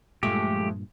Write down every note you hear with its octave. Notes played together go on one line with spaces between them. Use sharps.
G2 A#2 F3 G#3 A3 G4